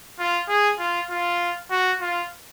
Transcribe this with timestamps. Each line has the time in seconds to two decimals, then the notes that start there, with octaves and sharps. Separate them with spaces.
0.19 F4
0.48 G#4
0.79 F4
1.10 F4
1.71 F#4
2.01 F4